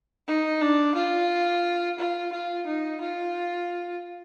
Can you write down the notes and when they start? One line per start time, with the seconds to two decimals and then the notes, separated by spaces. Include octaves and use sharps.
0.27 D#4
0.61 D4
0.96 F4
1.98 F4
2.32 F4
2.66 D#4
3.01 F4